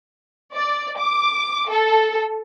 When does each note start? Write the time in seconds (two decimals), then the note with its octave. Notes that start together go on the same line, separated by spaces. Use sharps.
0.55 D5
0.98 D6
1.70 A4